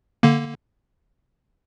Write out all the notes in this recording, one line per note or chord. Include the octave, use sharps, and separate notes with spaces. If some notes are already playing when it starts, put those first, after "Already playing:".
D3 A#3